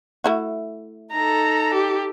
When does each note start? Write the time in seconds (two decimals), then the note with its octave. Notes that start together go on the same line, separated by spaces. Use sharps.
0.24 A3 E4 F#4
1.12 D#4 A4 A#5
1.74 G4